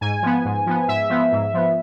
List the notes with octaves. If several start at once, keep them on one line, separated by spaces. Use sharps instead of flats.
G#2 G#5
F3 B3
G#2
F3 B3
G#2 E5
F3 B3
G#2
F3 B3